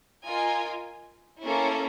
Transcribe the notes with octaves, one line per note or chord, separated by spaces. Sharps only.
F4 A#4 D#5 G#5
A#3 C#4 E4 A4 C#5